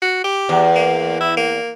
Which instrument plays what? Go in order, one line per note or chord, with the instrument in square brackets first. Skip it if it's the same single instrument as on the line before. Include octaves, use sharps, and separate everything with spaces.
[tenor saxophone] F#4
G4
[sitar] E2
[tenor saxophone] A#3
E4
A#3